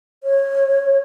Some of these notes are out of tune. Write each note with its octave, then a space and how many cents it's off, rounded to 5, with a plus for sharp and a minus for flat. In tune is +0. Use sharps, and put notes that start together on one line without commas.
C#5 -20